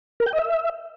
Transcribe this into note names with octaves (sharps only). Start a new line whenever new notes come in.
A#4
G5
D#5
E5